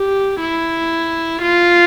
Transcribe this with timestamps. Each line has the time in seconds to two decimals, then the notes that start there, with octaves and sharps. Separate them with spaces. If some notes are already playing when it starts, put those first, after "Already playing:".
Already playing: G4
0.41 E4
1.42 F4